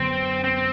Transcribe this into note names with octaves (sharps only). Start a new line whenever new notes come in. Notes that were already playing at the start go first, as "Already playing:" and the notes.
Already playing: F#2 D3 F#3 B3 C4
C4